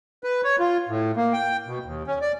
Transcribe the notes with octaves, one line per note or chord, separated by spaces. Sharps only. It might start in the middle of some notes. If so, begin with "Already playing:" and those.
B4
C#5
F4
A2
A#3
G5
B2
D#2
C#4
D5